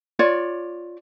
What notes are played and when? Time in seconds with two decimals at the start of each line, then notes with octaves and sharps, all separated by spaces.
0.19 F4 C#5 D5